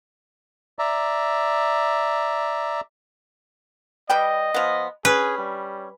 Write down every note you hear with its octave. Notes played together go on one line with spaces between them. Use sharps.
D5 E5 A#5
G3 B4 D#5 G5
F3 B3
C#4 G#4 B4
G3